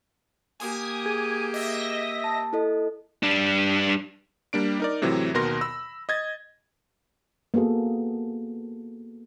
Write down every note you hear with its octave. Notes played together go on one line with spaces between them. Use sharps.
A#3 G4 G#5 D#6
G#4 G#6
D#5 E5 A#6
A5
E4 A4 D#5
G3 D4
G3 A#3 D4 D7
D#4 A#4 D5
A2 C3 E3 F#3
D#2 B2 A#4 C6 A#6
B5 E6
D#5 G#6 A6
A#3 B3 F#4 G#4 A4